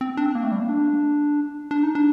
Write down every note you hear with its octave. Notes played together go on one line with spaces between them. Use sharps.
C4
D4
C4
A#3
A3
G3
A#3
D4
D4
D#4
D4